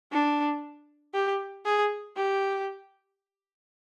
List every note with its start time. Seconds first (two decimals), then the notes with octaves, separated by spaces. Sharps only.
0.12 D4
1.14 G4
1.65 G#4
2.16 G4